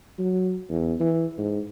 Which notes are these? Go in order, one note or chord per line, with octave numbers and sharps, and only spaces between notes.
F#3
E2
E3
G#2